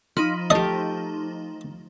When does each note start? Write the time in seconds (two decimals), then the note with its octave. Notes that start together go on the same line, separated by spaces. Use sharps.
0.17 F3 D#4 B5
0.50 A3 G4 D#5